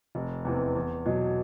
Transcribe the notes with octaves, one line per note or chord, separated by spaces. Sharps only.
F1
E2 C3 E3
E2
B2 F#3